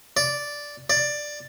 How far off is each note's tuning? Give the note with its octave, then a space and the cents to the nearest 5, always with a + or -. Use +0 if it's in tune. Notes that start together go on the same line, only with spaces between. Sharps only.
D5 -5
D5 +10